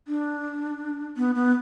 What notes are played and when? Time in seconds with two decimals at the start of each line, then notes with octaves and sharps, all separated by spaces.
0.08 D4
1.17 B3
1.35 B3